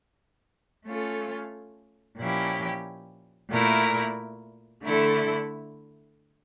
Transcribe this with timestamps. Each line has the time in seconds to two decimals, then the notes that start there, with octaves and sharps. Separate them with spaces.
0.86 A3 C#4 F4 A4
2.18 A#2 F3 C#4 E4 G4
3.51 A#2 A3 E4 A#4
4.84 D3 A3 E4 A4